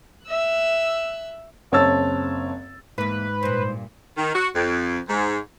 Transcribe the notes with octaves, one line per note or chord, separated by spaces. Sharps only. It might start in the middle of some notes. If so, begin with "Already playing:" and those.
E5 E6 F#6
F#1 C4 C#5 A5 E6 A6
E2 G#2 A#3 B4
G2 A#2 C5
D#3
F#4
F2
G#2